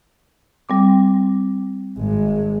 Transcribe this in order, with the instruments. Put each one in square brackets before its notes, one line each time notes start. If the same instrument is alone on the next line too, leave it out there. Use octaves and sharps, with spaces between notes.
[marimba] G3 C4 D6
[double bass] G#1 G#3